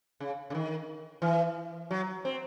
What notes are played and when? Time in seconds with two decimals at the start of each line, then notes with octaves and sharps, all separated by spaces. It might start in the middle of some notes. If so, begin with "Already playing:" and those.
0.20 C#3
0.50 C#3
0.55 D#3
1.22 E3
1.91 F#3
2.25 C4